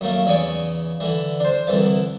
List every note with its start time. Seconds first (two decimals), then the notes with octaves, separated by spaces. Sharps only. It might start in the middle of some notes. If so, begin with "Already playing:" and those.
0.01 F#2 A3 A#3
0.26 E2 C#3 C#5 D5 G#5
1.00 D3 E3
1.40 D4 C5
1.67 C2 D3 E3 A5